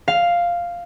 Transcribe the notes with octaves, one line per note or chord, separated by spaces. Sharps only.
F5